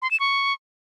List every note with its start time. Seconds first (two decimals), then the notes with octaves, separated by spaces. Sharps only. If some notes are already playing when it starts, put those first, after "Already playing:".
0.02 C6
0.11 E7
0.20 C#6